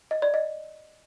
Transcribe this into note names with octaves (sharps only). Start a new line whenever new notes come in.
D#5
D5
D#5